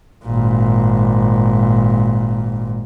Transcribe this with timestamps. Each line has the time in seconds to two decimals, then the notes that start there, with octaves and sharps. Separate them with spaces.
0.25 G#1 A#2